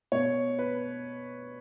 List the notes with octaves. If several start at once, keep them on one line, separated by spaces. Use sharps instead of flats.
B2 C#5
B4